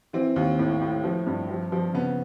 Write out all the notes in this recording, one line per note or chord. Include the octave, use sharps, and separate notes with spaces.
E3 C4
D#2
A2
A2
F3
G2
F3
F3
C#3 B3